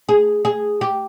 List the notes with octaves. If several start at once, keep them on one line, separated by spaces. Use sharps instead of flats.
G#4
G#4
G4